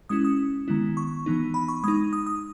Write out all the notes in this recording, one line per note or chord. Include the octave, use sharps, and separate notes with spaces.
G#3 C#4 E4 D#6
D#6
D#3 G#3 B3 E4
C#6
E3 B3 D#4
B5
C#6
G#3 D#4 D#6
D#6
D#6